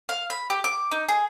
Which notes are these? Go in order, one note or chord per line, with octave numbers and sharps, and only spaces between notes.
F5
B5
G4
D6
D#4
G#4